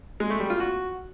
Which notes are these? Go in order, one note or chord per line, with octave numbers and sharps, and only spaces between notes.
G#3
A3
G3
F4
F#4